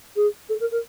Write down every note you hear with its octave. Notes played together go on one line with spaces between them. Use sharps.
G#4
A4
A#4
A#4